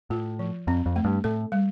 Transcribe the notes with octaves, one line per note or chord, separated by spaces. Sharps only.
A2 F4
F3
F2 C4
F2
A3
G2
A2 A4
G3